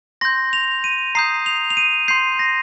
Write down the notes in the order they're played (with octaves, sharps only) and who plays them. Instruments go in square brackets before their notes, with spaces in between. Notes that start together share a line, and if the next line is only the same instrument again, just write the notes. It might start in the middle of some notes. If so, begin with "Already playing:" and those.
[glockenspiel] C6 G6 A#6
F7
D#7
A#5 D#6 G6 C7
F7
F7
D#7
C6 G6 C7
A#6